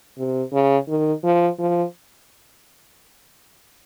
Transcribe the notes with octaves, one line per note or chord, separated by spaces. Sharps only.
C3
C#3
D#3
F3
F3